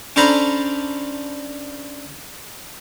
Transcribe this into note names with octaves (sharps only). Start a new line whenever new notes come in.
C#4 D4 A4 C5 A#5 B5